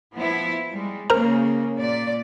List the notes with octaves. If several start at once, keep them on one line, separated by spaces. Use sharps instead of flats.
F3 B3 E4
G3 G#3
C#3 A#3 A#4 C5 A#5
A#2 D5